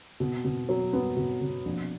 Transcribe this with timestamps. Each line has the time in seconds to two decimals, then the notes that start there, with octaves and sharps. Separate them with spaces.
0.20 B2
0.45 B2
0.69 F#3
0.93 B3
1.17 B2
1.41 B2
1.65 A#1